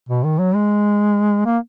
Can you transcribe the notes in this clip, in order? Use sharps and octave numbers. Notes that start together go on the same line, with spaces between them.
B2
D#3
F#3
G#3
A#3